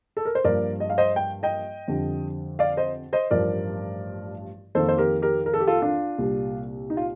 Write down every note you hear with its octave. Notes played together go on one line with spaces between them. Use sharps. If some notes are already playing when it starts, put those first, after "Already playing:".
A4
A#4
C5
G2 F3 A#3 A#4 D5
D#5
F5
C5 D#5
G5
D#5 G5
F2 D3 G3
D5 F5
C5 D#5
C5 D#5
A1 G2 F3 A#4 D5
F2 D#3 A#3 A4 C5
C5
G4 A#4
G4 A#4
A#4
A4
G4
F4 A4
D4 F4
C2 A#2 G3
D#4
F4